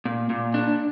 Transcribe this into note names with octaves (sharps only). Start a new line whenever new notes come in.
A#2
A#2
D4